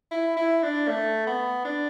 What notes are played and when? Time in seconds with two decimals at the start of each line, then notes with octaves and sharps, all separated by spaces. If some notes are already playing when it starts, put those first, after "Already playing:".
0.11 E4
0.36 E4
0.63 D4
0.88 A3
1.27 B3
1.65 D4